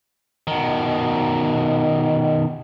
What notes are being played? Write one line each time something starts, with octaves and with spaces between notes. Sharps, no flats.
B2 D#3